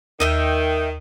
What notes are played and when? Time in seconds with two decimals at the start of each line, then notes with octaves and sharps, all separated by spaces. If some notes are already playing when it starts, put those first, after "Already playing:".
0.20 D#2 D#3 D#5 E5 G5